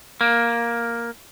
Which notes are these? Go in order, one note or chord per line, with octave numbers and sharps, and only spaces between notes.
A#3